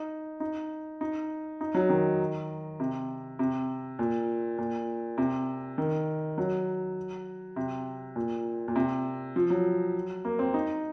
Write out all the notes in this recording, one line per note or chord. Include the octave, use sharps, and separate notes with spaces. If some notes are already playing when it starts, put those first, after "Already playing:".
Already playing: D#4
D#4
D#4
D#4
F#3
D#3
C3
C3
A#2
A#2
C3
D#3
F#3
C3
A#2
A#2
C3
F3
F#3
A#3
C4
D#4